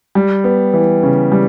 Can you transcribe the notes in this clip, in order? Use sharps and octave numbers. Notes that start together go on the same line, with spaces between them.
G3
B3
E3
C#3
G3